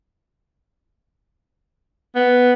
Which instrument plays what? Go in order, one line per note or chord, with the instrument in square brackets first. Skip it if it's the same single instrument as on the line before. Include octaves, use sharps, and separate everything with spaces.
[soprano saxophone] B3